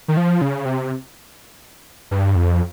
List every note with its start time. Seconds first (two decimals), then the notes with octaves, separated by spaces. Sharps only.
0.08 D#3
0.17 F3
0.41 C#3
0.65 C3
2.11 G2
2.35 F2